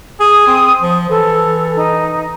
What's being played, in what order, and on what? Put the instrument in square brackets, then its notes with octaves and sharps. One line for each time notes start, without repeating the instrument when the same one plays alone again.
[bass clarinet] G#4 [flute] D#6
[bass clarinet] C4
F3
[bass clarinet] E3 [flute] A4
[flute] D#4